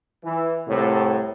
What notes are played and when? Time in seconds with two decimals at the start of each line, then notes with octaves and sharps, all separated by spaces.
0.23 E3
0.67 C2 A2